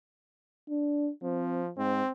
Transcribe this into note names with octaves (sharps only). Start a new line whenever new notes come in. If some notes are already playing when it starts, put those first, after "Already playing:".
D4
F3 C4
G#2 C4